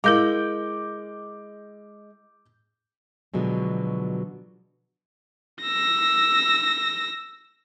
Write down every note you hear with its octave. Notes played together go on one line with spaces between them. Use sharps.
G#3 E4 A#4 F5 D6 G6
B2 D3 F3 F#3 G#3
E6 A#6